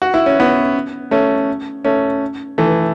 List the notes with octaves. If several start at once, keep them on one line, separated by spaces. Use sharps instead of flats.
F#4
E4
C#4
B3 E4
A3 C#4
A3 C#4
E3 A3